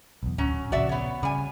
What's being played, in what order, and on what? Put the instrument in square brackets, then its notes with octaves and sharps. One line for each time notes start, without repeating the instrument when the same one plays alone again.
[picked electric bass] B1 E2
[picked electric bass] D1 [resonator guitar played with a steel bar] F#3 C#4
[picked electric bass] A#1 C#3 [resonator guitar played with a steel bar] F#4 D5 E5
[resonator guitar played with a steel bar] B3 C#5
[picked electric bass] C#3 [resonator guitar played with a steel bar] G3 G#5